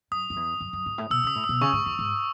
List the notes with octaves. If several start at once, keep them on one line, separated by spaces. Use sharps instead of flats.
F#2 D#6
F#2
E2
F#2
F#2
G#2
A2
B2 E6
C#3 D#6
A2
D#6
B2
C#3 C#6
G#2
E2
G#2